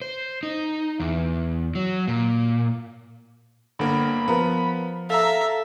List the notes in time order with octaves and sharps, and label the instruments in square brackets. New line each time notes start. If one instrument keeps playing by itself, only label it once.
[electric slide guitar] C5
D#4
E2
F#3
A#2
[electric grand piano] G1 A#3 A#4 [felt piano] D3 [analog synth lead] B5
[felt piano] F3 A#4 [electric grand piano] B3
[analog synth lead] A4 [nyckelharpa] E5 [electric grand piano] F5 A#5